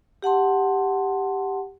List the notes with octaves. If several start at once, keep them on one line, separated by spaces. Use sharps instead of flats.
G4 F#5 A5 C6